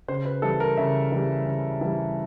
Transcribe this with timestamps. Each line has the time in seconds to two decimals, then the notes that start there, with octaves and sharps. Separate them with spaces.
0.08 C#3 C5
0.25 B4
0.42 E3 G3 A4
0.60 A#4
0.77 C#3 E5
1.12 E3 G3
1.46 C#3
1.81 E3 G3